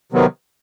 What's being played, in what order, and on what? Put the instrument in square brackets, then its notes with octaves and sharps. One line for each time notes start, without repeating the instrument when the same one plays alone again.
[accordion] C3 D#3 F#3 B3